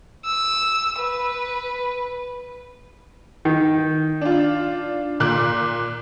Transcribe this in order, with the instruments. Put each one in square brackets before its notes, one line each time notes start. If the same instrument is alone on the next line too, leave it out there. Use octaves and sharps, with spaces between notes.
[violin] E6
B4
[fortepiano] D#3
[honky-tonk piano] D4 F4
A#2 D6 F#6